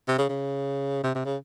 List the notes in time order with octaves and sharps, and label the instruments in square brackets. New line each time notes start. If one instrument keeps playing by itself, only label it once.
[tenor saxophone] C3
C#3
C#3
C3
C3
C#3